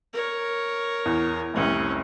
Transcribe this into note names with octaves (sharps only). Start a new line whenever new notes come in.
A#4 C#5
E2
F1 C2 C4 C#4